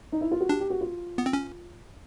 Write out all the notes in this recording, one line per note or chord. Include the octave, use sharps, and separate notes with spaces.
D#4
E4
F4
F#4
D4 G4
G4
F#4
F4
B3
C4
C#4